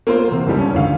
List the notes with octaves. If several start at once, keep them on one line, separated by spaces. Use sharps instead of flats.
A#3 F4 C5
E2 C3
C#2 G#2 G3 A4
C#4
G#1 D2 F5